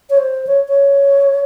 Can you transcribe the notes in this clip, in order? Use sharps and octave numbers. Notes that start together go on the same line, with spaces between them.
C#5
C5
C#5
C#5